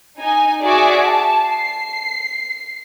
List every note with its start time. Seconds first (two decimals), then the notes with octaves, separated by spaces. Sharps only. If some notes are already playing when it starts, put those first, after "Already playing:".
0.19 D#4 G#5
0.63 F#4 G#4 D5 E5 G#5 D6
1.03 A5
1.46 C7